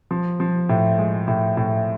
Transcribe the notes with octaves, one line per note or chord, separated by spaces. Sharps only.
F3
F3
A2
G#3
A2
A2